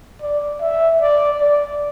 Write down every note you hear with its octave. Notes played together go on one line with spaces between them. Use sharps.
D5
E5
D5
D5